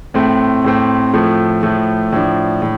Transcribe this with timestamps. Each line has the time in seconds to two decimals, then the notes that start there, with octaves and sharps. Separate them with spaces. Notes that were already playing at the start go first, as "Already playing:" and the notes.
0.14 A2 A3 C4
0.64 A2 A3 C4
1.13 A2 F3 A3
1.63 A2 F3 A3
2.12 A2 F3 D4
2.62 A2